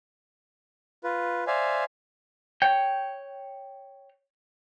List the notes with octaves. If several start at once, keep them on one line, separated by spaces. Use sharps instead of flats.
F4 B4
C5 D5 E5 F5 G#5
C#5 G5